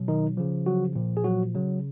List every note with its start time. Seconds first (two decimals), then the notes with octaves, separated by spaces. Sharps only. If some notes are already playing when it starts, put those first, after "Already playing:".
Already playing: B2 F#3
0.08 D#3 D#4
0.37 C#3 F3
0.66 F#3 F#4
0.95 A#2 F3
1.17 G#4
1.24 F#3 F#4
1.54 C#3 F#3